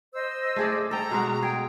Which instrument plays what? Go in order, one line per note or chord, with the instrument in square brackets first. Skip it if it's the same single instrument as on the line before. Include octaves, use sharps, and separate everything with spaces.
[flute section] C5 D#5 E6
[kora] A3 G#4 D5
[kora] A4 G5 [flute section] A#5
[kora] B2 G#3 F#4
[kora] G#4 [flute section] G5